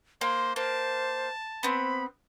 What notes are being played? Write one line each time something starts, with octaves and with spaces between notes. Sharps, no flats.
A#3 C5 C6
A#3 C5 A5
B3 C4 B5